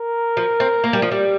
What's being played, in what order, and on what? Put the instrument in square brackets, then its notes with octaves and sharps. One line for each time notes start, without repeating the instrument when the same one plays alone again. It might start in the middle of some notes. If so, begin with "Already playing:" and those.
Already playing: [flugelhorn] A#4
[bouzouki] F3
C4
A#3
G3
F3
G3